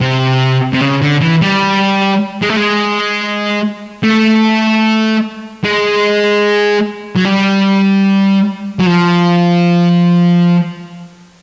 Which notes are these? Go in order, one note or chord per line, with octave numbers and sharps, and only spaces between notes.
C3
C3
C#3
D3
E3
G3
G#3
A3
G#3
A3
G#3
F#3
G3
F#3
F3